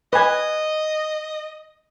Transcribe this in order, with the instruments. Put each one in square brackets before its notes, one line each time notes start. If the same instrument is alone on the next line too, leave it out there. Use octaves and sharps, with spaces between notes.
[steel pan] B4 G#5 [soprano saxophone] D#5